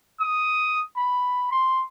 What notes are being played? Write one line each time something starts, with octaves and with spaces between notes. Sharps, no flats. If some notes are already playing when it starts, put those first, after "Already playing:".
D#6
B5
C6